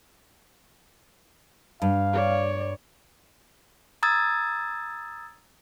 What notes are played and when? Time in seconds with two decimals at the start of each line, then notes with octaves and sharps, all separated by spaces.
1.82 G2 F5
2.13 C#5 D5
4.03 A#5 D#6 E6 G#6 A6